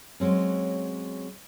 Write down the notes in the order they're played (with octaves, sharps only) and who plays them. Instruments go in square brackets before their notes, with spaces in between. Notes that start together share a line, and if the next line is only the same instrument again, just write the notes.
[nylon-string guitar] F#3 G#3 C4 C#4